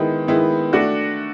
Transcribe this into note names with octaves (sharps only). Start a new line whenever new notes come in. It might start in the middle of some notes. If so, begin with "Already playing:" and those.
Already playing: D#3 G#3 B3 E4
D#3 G#3 B3 E4
A3 D4 F#4